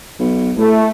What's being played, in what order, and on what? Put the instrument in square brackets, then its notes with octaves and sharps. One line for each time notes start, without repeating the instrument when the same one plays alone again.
[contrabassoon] B1
[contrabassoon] A2 [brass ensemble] A3